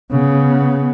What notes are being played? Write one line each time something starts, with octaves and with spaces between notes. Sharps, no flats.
C#3 B3